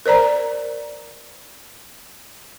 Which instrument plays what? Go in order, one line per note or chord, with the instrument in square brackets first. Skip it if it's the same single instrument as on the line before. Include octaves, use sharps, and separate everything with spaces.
[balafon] A#4 C5 D5 A#5